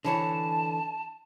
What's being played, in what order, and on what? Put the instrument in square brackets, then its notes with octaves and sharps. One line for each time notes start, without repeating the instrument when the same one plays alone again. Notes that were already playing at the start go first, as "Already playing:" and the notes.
[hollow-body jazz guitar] D3 E3 C#5 [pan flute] A5